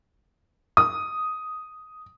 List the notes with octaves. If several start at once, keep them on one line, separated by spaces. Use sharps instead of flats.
D#6